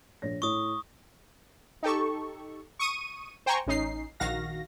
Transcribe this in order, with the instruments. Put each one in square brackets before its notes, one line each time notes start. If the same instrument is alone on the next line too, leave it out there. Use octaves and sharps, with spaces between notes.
[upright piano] A#1 C#5 A#6
[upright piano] A2 E4 C#5 [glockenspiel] C#6 D#6
[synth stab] D#4 G4 A4 C#6
C#6 D#6 D#7
C5 G5 G#5 A#5 C#6
A1 C#4 D#4 C7
A#1 D#3 F#4 F5 A#6